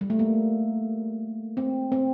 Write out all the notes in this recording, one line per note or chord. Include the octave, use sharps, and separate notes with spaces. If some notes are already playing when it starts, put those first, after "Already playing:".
G3
A3
A#3
C4
C4